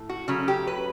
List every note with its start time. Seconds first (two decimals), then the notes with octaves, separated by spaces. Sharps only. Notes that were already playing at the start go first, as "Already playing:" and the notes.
Already playing: A2
0.09 F#4
0.28 C#3 F#3 A3 C#4
0.48 G4
0.67 B4